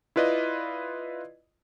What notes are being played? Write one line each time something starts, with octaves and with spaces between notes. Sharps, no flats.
E4 F4 B4 D5 D#5